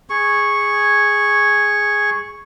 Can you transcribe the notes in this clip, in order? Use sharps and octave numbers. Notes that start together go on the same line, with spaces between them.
G#4 C#6